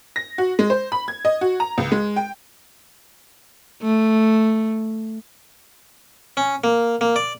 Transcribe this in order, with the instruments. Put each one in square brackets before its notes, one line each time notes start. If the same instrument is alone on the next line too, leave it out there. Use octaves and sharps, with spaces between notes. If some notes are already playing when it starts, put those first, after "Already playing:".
[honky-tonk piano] A#6
F#4
G#3
C5
B5
G#6
D#5
F#4
A#5
C#2
G#3
G5
[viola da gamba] A3
[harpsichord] C#4
A#3
A#3
D5